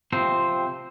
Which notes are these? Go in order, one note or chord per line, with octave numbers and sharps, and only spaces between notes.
C3 F3 C4 C5